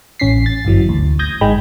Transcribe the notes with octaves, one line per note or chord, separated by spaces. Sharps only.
A1 C#4 B6 C7
A6
G1 F#2 E3 F#3
D2
D#6 G6 G#6 A#6
G#1 G#2 G#3 G5 B5